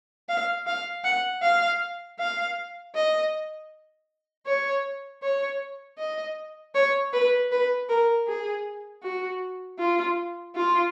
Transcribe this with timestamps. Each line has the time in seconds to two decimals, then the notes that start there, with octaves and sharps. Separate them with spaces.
0.29 F5
0.67 F5
1.04 F#5
1.43 F5
2.19 F5
2.95 D#5
4.46 C#5
5.23 C#5
5.98 D#5
6.75 C#5
7.13 B4
7.52 B4
7.89 A#4
8.28 G#4
9.03 F#4
9.79 F4
10.56 F4